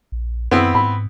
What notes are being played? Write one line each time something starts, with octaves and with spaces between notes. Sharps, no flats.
A#1
F#2 B3 C4 E4
G#2 B5